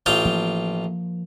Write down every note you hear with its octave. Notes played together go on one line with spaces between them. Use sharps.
A1 F4 G5
F3 A#3